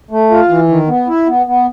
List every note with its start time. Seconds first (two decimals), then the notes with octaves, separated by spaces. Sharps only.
0.11 A3
0.30 F4
0.49 E3
0.69 D#3
0.88 B3
1.07 E4
1.27 B3
1.46 B3